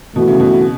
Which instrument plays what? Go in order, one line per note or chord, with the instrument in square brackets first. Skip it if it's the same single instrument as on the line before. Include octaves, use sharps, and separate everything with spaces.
[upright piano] B2 [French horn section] E3 A3 F#4
[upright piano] C#3
B2